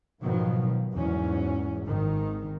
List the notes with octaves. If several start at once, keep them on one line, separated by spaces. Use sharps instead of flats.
G#2 B2 D#3 F3 F#3
E2 G#2 F#3 C#4
G#1 D#3